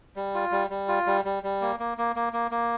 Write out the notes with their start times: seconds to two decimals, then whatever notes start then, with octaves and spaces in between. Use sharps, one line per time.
0.16 G3
0.34 F4
0.51 G3
0.70 G3
0.88 F4
1.07 G3
1.25 G3
1.43 G3
1.61 A#3
1.80 A#3
1.98 A#3
2.16 A#3
2.33 A#3
2.51 A#3